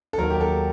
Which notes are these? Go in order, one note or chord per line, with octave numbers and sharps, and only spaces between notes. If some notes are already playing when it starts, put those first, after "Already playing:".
A4
D#2 D#3 F#3 A#4
G4
A4